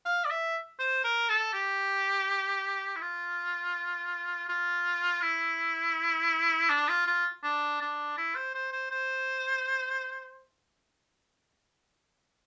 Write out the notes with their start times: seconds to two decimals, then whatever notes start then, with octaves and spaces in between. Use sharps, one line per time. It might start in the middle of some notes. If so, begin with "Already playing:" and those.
0.05 F5
0.24 D5
0.30 E5
0.79 C5
1.04 A#4
1.29 A4
1.53 G4
2.96 E4
3.01 F4
4.49 F4
5.21 E4
6.69 D4
6.89 F4
7.06 F4
7.43 D4
7.81 D4
8.17 E4
8.35 C5
8.55 C5
8.72 C5
8.91 C5